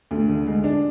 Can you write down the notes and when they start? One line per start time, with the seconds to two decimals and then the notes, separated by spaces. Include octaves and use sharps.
0.11 D2
0.29 D3
0.47 G#3
0.64 D4